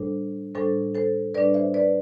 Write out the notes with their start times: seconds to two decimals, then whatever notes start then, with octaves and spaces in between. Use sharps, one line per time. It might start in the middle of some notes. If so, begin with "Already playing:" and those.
Already playing: A2 G3 D4 A4 C5
0.55 A2 G3 D4 A4 C5
0.95 A4 C5
1.34 A2 G3 D4 B4 D5
1.54 C5 E5
1.74 B4 D5